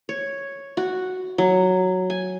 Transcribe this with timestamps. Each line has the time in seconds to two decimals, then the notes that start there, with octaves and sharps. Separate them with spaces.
0.09 C#5
0.77 F#4
1.38 F#3
2.10 G#5